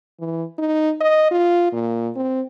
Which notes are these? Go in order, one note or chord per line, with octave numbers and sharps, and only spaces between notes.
E3
D#4
D#5
F4
A#2
C4